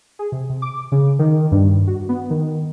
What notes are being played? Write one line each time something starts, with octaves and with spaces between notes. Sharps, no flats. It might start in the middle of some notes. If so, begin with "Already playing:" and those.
G#4
C3
C3
D6
C#3
D#3
G2
G2
F#4
B3
D#3